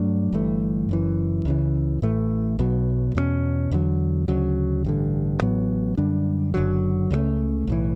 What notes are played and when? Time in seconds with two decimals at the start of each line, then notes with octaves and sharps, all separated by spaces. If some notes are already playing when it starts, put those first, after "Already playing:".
Already playing: G2 F#3 A3 D4
0.32 G1 G2 E3 A3
0.89 F#1 F#2 E3
1.45 C#2 C#3 E3
2.02 A1 A2 E3 A3
2.59 B1 B2 F#3
3.15 E2 B2 A3 C#4
3.71 E2 D3 F#3
4.28 D2 C#3 F#3
4.85 A1 G2 D3
5.41 A1 A2 F#3 B3
5.97 F#2 D3 G3 D4
6.54 F#1 F#2 D3 F#3
7.10 C#2 C#3 F#3 A3
7.67 B1 A2 E3